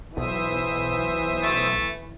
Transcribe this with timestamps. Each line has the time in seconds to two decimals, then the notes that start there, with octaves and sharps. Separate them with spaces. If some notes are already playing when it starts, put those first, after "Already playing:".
0.17 B1 E3 C5 E5 D#6
1.43 A3